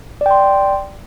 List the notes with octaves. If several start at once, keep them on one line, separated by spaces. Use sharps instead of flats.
D5 G5 C6